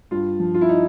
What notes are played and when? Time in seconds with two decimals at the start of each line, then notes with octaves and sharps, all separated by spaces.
0.11 G2 F4
0.40 F3
0.54 F4
0.61 E4
0.69 D#4